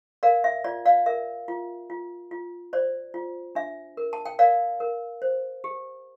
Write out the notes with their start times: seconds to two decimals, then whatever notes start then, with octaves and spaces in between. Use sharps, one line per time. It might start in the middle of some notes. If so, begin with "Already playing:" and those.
0.23 A#4 D5 F5
0.44 E5
0.64 F4 D5
0.85 D5 F5
1.06 A#4 E5
1.48 F4
1.90 F4
2.31 F4
2.73 C5 D5
3.14 F4
3.55 D4 E5
3.97 A#4
4.13 A5
4.26 G5
4.39 A#4 D5 F5
4.80 A#4
5.22 C5
5.64 G4